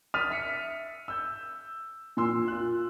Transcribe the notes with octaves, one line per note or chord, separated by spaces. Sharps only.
D#6 F6 A6 B6 D#7 F7
E5 B6 C#7
E6 G6
A#2 G#5 C6 E6
F4 F#6